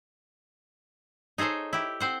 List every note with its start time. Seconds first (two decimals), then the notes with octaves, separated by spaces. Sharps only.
1.38 D#4 G#4 A4 C5 C#5
1.73 E4 G4
2.00 C4 C5 F#5